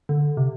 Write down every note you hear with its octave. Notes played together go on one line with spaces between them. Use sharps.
D3
C3